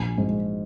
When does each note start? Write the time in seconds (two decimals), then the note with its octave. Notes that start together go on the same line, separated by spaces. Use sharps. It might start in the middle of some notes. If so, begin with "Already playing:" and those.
Already playing: A#1 G#5
0.18 G#2